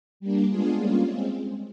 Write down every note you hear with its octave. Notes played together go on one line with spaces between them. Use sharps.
G3 A#3 D4
G#3 B3 D4 F4 G#4
G3 A#3 C#4 F4
G#3 C4